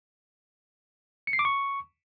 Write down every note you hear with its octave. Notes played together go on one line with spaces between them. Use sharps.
C#7
C7
D6
C#6